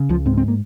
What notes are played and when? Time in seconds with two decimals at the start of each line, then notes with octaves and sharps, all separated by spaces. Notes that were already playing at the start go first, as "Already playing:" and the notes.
Already playing: C#3
0.09 C#2 F3
0.26 G#2 C4
0.37 C4
0.48 A#3